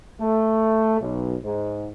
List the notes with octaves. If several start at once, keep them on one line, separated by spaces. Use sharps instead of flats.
A3
B1
G#2